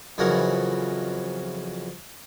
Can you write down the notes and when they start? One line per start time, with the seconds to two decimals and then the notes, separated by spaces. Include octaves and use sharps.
0.18 F2 C#3 E3 F#3 A#4 F#5